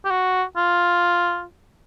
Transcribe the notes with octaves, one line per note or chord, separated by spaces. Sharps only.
G4
F#4
F4